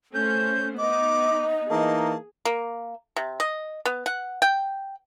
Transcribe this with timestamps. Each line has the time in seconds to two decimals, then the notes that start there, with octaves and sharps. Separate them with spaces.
0.14 A3 C#4 C5 G6
0.78 B3 D#4 D#5 D6
1.70 E3 A#3 D#4 G#4 A5
2.45 A#3
3.16 C3
3.40 D#5
3.85 B3
4.06 F#5
4.42 G5